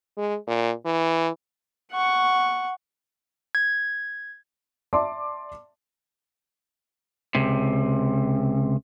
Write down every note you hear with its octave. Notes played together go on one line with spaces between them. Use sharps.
G#3
A#2
E3
F#5 C#6
G#6
D5 E5 A5 C6 D6
C#2 C3